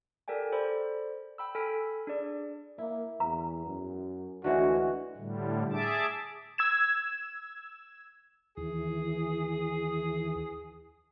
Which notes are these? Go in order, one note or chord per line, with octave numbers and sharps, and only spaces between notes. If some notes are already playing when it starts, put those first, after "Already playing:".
G4 A4 A#4 D5 G5 G#5
A4 C5 D5 B5
G5 B5 E6
A4 G#5 B5 F6 B6 D7
D4 G#4 D5
A#3 E4
E2 A#5
F#2
D2 D3 E3 G#3 F#4
A2 D3 G3
G#4 E5 A5 D6
E6 G#6 E7
D#2 E3 G#4